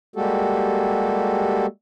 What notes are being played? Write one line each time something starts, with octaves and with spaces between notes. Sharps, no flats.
G3 G#3 A#3 F#4 G4 A4